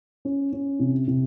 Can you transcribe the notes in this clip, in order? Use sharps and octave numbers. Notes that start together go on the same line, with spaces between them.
C#4
C#4
C3
C3